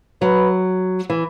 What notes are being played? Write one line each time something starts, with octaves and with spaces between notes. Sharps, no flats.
F#3 B4
E3